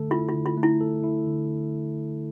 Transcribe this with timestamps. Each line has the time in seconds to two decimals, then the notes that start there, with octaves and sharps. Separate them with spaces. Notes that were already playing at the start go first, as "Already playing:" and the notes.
Already playing: D3 A3 A4
0.11 E4 F4
0.28 F4
0.34 D3
0.46 F4
0.58 A3
0.63 E4
0.81 A4
1.04 E4
1.27 D3